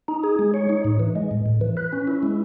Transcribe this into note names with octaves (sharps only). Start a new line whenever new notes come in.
D#4
G#4
G#3
C#5
D#4
A2
E3
G#3
A2
A2
E3
B4
C#4
E4
G#3